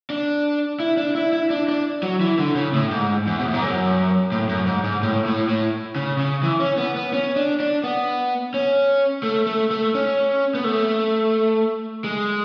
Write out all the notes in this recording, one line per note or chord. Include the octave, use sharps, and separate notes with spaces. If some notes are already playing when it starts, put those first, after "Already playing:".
D4
E4
D4
E4
E4
D4
D4
F#3
E3
D3
C#3
A2
G#2
E2
B2
A2
G#2
F#2
A2
F#2
G#2
G#2
A2
A2
A2
C#3
C#3
E3
C#4
B3
B3
C#4
D4
D4
B3
C#4
A3
A3
A3
C#4
B3
A3
G#3